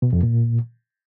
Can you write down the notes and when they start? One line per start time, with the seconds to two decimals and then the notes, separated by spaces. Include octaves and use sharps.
0.02 B2
0.13 F2
0.23 A#2